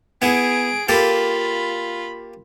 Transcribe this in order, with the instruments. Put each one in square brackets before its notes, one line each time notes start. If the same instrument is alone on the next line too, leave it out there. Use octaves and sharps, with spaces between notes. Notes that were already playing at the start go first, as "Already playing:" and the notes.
[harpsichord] B3 E4 [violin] G#4 D7
[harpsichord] A#3 G4 A4 [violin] F4 B5